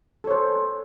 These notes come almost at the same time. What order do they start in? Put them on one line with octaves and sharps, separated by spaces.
A4 C#5 C5